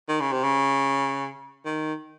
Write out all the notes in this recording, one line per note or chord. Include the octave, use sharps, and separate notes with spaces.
D#3
C#3
C3
C#3
D#3